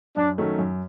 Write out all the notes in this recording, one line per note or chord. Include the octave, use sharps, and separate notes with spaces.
F#2 D4
D#3 F#3 A3 C#4
F#2